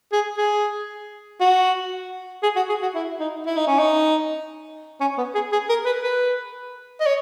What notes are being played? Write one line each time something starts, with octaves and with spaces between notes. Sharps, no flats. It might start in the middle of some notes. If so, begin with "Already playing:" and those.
G#4
G#4
F#4
G#4
F#4
G#4
F#4
E4
D#4
E4
D#4
C#4
D#4
C#4
B3
G#4
G#4
A#4
B4
B4
D#5
C#5